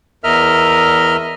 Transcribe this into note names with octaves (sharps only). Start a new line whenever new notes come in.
E2 A#4 D#5 E5 F6